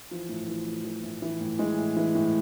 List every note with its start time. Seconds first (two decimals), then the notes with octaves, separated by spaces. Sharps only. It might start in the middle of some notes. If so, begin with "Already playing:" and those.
0.11 E3 F3
0.29 A2
0.48 E3
0.66 A2
0.85 E3
1.03 A2
1.22 E3
1.40 A2
1.59 E3 G#3
1.78 A2
1.96 E3
2.15 A2